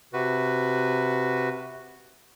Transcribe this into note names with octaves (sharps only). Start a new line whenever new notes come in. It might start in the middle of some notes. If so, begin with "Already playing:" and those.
C3 F#4 B4